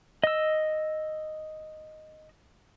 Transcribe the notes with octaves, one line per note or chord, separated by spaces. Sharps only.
D#5 E6